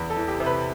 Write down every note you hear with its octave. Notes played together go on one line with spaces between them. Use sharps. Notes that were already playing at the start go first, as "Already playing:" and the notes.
Already playing: E2 B4
A4
E3
G4
C3
B4